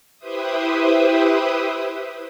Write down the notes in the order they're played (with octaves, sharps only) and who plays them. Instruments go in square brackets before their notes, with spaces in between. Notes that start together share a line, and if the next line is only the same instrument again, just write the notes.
[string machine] E4 G4 B4 C5 E5 D#6